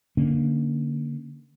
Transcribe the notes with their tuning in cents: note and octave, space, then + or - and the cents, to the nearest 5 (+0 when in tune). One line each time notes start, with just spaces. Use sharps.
D3 +0 A#3 +0 C#4 +0